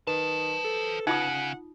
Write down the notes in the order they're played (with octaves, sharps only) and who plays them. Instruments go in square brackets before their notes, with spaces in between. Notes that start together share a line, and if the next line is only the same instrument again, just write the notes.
[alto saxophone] D#3 [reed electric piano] B4 [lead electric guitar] C5 A5
[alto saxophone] A4
[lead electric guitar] C#3 [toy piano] D#4 F4 D#6 [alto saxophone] F#5